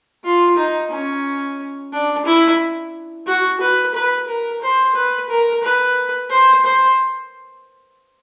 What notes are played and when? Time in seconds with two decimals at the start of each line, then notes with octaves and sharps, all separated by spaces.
0.24 F4
0.57 D#4
0.91 C#4
1.93 D4
2.26 E4
3.26 F#4
3.61 B4
3.95 B4
4.28 A#4
4.62 C5
4.95 B4
5.29 A#4
5.63 B4
6.30 C5
6.65 C5